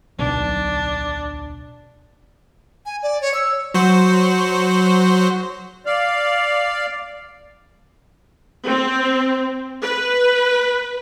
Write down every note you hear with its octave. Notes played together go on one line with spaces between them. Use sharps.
D1 B1 B2 D4
G#5
D5
C#5
E6
F#3 F#4 C5
D5 F5
C4
B4